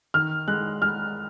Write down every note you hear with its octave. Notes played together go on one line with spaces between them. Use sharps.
D#3 F6
G#3 F#6
G#3 F6